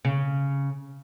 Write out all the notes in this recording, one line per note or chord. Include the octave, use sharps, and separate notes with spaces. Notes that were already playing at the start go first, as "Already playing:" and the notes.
C#3